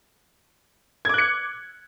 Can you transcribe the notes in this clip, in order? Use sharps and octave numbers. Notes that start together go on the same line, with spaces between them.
D6 F#6 G#6 C#7